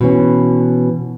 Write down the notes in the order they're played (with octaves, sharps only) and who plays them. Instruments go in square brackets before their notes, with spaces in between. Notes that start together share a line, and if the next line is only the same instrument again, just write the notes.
[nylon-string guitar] B2 E3 C#4